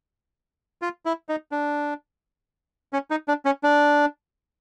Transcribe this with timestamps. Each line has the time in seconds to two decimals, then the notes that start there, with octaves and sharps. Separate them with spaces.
0.82 F4
1.06 E4
1.29 D#4
1.51 D4
2.93 C#4
3.10 D#4
3.28 D4
3.45 C#4
3.63 D4